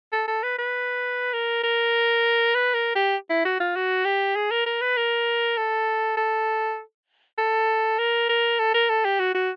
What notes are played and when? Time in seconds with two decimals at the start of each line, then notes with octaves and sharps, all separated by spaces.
0.13 A4
0.28 A4
0.43 B4
0.59 B4
1.33 A#4
1.63 A#4
2.55 B4
2.74 A#4
2.95 G4
3.30 E4
3.45 F#4
3.60 F4
3.76 F#4
4.05 G4
4.36 G#4
4.51 A#4
4.66 A#4
4.81 B4
4.97 A#4
5.58 A4
6.17 A4
7.38 A4
7.99 A#4
8.29 A#4
8.59 A4
8.74 A#4
8.89 A4
9.05 G4
9.20 F#4
9.35 F#4